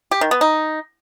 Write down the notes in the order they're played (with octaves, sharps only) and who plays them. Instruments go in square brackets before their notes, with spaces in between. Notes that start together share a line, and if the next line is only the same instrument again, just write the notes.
[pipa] G4
D#3
B3
D#4